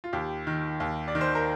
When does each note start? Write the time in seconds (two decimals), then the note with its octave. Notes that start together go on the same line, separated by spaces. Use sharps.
0.04 F4
0.13 D#2 G4
0.47 D#3
0.80 D#2
1.08 D5
1.15 D#3
1.21 C5
1.35 A#4